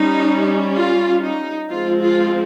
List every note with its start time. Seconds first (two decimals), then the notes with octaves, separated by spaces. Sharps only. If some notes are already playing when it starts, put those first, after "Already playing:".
Already playing: G3 C#4 D#4
0.76 F4
1.22 D#4
1.69 F3 G#3 C4 F4
2.01 F4